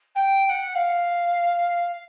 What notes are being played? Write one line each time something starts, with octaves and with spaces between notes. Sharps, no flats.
G5
G5
F#5
F5